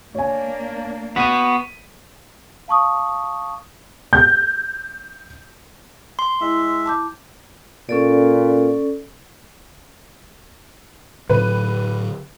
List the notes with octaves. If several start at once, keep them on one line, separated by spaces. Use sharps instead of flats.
A#3 D4 C#5 G#5
B3 F#4 B6 D#7
F5 A5 C#6 D#6
G6
C6
G#3 E4 E5
A5 D6 G6
A#2 C#4 A4 D5
A2 D3 F#3 B4